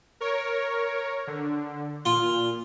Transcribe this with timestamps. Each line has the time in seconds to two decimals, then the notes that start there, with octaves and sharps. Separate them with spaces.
0.21 A#4 C#5
1.27 D3
2.05 A#2 F4